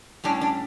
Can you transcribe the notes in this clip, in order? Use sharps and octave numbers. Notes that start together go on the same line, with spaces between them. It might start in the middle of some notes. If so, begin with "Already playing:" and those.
A2 G3 C#4 D4
D4